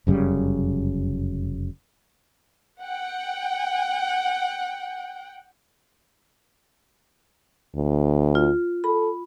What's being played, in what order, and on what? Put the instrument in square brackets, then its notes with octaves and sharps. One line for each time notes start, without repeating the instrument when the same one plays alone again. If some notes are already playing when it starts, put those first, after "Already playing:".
[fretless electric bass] F1 F#2 C#3 G3
[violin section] F#5 G5
[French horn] D2
[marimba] F4
[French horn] A4 [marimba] B5